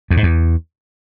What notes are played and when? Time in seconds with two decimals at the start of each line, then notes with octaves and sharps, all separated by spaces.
0.10 E2
0.17 G#2
0.23 E2